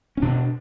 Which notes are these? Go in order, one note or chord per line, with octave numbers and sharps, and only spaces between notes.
C#4
B2 D4